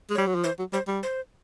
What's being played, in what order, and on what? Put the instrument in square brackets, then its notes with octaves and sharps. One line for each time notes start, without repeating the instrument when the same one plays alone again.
[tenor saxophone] G#3
[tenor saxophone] G3 [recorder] C#5
[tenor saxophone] F#3
F3
[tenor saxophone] E3 [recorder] C5
[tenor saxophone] F#3
[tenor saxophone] G3 [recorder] C5
[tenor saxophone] G3
[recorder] C5